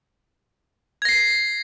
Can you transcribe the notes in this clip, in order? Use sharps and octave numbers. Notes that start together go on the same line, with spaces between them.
G#6 A#6 C7